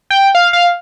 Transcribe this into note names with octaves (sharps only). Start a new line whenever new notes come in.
G5
F5
F5